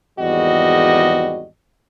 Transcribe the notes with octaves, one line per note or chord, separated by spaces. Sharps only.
G#1 E2 G3 F#4 D#5